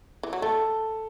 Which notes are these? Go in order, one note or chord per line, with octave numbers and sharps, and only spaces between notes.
E3
F#3
A3 A4